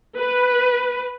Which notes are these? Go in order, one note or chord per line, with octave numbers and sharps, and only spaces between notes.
B4